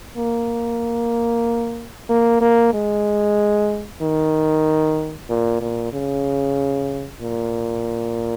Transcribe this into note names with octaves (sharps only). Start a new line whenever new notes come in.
A#3
A#3
A#3
G#3
D#3
A#2
A#2
C#3
A#2